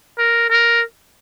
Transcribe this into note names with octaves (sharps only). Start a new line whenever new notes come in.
A#4
A#4